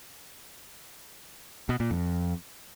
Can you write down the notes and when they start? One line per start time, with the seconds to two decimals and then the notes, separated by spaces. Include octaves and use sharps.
1.69 B2
1.80 A#2
1.91 F2